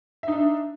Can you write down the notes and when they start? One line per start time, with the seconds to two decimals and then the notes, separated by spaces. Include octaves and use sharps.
0.23 E5
0.28 D#4
0.32 D4